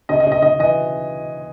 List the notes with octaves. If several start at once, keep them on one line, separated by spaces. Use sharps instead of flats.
C#3 D#5
D#5
C#3
D#5
C#3 D#5
E3 D#5